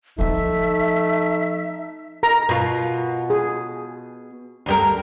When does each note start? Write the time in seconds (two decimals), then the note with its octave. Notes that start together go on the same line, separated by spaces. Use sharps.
0.19 F3 A3 C4 D#4 E5
2.23 A#4 A#5
2.49 B2 F4
3.30 G#4
4.66 D2 G3 A#4